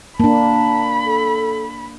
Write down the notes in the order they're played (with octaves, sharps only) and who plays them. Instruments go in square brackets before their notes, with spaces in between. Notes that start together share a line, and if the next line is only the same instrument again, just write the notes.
[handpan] A#3 D4 [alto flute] A5 [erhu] B5
[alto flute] A4